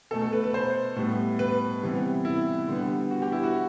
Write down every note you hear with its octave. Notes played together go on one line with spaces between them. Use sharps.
B2 A3 A4
A4
B4
B4
C5
A2 G3 B3
B4
C3 E3 G3 B3
E4
D3 G3 B3
F#4
G4
E4
F#4